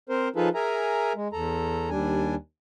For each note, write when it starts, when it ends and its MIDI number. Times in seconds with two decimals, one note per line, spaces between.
0.09 0.29 60
0.09 0.29 70
0.09 0.29 72
0.36 0.49 53
0.36 0.49 63
0.36 0.49 65
0.36 0.49 68
0.36 0.49 69
0.36 0.49 71
0.55 1.13 68
0.55 1.13 70
0.55 1.13 76
0.55 1.13 80
0.55 1.13 82
1.15 1.28 56
1.33 1.90 40
1.33 1.90 69
1.33 1.90 82
1.90 2.35 39
1.90 2.35 55
1.90 2.35 62
1.90 2.35 80